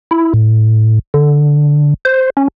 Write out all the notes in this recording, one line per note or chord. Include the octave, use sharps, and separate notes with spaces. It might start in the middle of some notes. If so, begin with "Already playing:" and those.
E4
A2
D3
C5
C#4